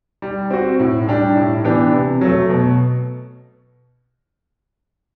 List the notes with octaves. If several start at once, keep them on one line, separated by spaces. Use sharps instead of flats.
G3
C4 F#4
A2
G3 D4 G4
A2
E3 B3 D4 G4
C3
F#3 A3
B2